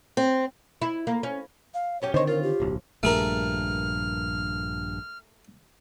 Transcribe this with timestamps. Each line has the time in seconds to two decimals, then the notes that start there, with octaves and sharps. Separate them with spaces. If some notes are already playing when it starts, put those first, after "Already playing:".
0.17 C4
0.82 E4
1.07 A#3
1.23 C#4
1.74 F5
2.02 F#2 C#4 G4 C#5
2.14 D3 D#3 C4 C5 C#5 D#5
2.27 F4 A#4
2.43 G4
2.60 D1 B1
3.03 A#1 G2 A3 G#4 A#4 F6